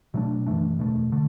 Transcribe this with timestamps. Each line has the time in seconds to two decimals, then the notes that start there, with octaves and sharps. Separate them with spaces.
0.14 B2 F#3 A3 D4
0.46 F#2 E3 A3 D4
0.78 E2 B2 A3
1.12 D3 A3